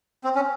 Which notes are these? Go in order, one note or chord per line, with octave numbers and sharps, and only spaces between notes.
C4
C#4